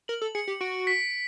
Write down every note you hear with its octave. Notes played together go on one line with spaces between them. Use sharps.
A#4 F#7
A4
G#4 C#7
G4
F#4 D7
B6